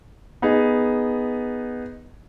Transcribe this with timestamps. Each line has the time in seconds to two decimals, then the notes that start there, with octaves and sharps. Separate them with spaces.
0.42 B3 D#4 G#4